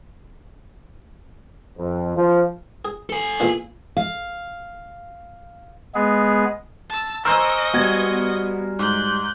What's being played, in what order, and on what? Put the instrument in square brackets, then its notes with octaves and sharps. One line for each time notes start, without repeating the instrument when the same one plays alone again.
[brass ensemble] F2
F3
[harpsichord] G#4
[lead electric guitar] A4 G#5
[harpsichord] E2 A#2 D4
[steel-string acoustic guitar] F5
[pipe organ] G#3 B3 G#4
[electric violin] A5 E6
[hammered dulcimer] A#4 C5 G#5 [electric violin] D#5 C#6 [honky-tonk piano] E6
[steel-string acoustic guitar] G3 F#4 [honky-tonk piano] B3 G#6
[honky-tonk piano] G#2 [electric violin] F#6 G6